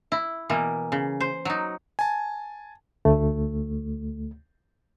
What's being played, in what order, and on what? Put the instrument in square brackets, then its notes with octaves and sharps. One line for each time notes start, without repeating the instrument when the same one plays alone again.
[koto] E4
B2 E3 A#3
C#3
C5
F#3 D#4
[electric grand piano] G#5 A5
[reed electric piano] D2 A3